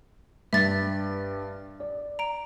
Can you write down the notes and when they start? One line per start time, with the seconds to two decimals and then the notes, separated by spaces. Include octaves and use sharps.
0.53 G2 E5 A6
1.80 D5
2.19 A#5 D7